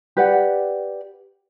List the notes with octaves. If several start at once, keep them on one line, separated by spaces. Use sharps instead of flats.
G4 B4 D5 F#5